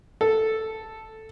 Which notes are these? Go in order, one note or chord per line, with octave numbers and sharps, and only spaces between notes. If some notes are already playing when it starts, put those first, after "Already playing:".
A4